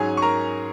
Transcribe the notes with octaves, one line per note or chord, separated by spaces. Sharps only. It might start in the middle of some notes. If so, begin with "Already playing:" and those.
Already playing: G#2 F#3 C#4 G#4 G#5
C#6
A#4 A#5